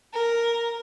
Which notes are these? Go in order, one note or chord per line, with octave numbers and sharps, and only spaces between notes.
A#4